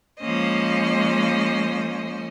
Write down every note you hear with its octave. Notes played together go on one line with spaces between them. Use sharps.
F3 G#3 A#3 C#4 C5 D#5